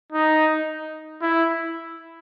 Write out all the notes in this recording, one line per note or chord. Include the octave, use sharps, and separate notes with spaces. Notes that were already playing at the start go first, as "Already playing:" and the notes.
D#4
E4